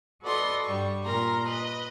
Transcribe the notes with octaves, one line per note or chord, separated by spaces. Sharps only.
F#4 A4 B4 D5 D#5 C6
G2 G3 C#6
A#2 A#4 A#5 C6
B4 D#5